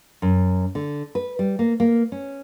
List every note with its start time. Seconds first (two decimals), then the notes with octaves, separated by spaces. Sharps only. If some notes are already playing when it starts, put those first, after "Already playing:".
0.22 F#2
0.75 D3
1.15 B4
1.39 G3
1.59 A#3
1.80 A#3
2.12 C#4